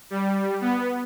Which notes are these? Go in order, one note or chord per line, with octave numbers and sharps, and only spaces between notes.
G3
B3